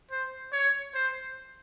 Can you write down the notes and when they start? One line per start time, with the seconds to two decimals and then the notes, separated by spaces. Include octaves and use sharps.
0.11 C5
0.53 C#5
0.95 C5